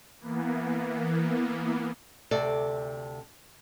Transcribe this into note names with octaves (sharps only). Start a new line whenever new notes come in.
E3 A#3 B3
D2 C3 A4 D5